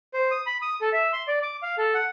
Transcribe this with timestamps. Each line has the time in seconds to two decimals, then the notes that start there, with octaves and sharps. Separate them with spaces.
0.14 C5
0.31 D#6
0.46 B5
0.62 D#6
0.81 A4
0.93 E5
1.13 C6
1.28 D5
1.43 D6
1.63 F5
1.78 A4
1.94 F#5